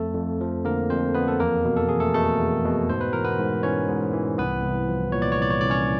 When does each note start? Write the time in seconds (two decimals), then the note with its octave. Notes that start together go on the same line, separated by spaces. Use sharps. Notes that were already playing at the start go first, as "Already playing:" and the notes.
Already playing: F2 A3 A4
0.15 F2
0.41 F3
0.65 D3 A#3 A#4
0.90 F2 C4 C5
1.14 F2 B3 B4
1.28 A4
1.40 E2 A#3 A#4
1.65 B2
1.77 A4
1.89 E2 G#4
2.00 A3 A4
2.14 B2 A3 A4
2.39 E2
2.65 B2
2.89 G#2 C5
3.01 B4
3.13 E3 A#4
3.25 B3 B4
3.39 G#2
3.63 E3 C#4 C#5
3.88 G#2
4.13 E3
4.38 C2 B3 B4
4.64 C2
4.88 F3
5.12 A#2 C#5
5.22 D5
5.32 C#5
5.38 C2 D5
5.51 C#5
5.61 C2 D5
5.70 C#4 C#5